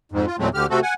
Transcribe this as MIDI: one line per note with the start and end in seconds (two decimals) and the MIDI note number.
0.12 0.26 41
0.12 0.26 44
0.27 0.36 65
0.39 0.49 40
0.39 0.49 46
0.39 0.49 54
0.39 0.49 56
0.39 0.49 57
0.39 0.49 60
0.54 0.66 38
0.54 0.66 50
0.54 0.66 67
0.54 0.66 89
0.70 0.80 48
0.70 0.80 57
0.70 0.80 60
0.70 0.80 66
0.70 0.80 69
0.83 0.94 78
0.83 0.94 80